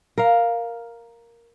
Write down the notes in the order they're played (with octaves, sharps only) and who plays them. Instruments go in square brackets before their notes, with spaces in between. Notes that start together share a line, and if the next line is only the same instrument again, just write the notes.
[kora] A#4 F5